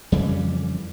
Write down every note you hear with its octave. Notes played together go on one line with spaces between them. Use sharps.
F2 C#3 E3 G3